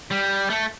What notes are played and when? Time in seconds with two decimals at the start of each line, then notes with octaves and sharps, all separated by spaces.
0.11 G3
0.50 A3